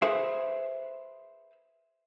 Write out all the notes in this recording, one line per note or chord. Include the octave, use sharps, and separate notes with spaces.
G#4 A4 B4 C5 E5 F5